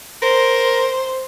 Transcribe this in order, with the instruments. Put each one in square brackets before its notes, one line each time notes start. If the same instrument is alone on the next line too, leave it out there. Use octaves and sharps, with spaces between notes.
[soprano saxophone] A#4 [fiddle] C5